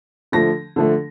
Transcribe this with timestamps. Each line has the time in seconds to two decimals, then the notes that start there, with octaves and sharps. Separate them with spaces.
0.32 D3 F3 A3 A#6
0.76 D3 F3 A3